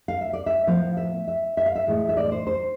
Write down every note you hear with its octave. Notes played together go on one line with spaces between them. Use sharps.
F5
E5
D5
E5
A2 F3 B3 F5
E5
E5
E5
F5
E5
A2 E3 G#3
E5
D5
C5
C5